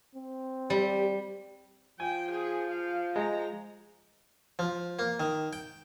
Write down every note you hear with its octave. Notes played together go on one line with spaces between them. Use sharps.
C4
G3 G4
F3 G5 G#5
G#4
F5
G#3 A#5
F3
A#3
D#3
G5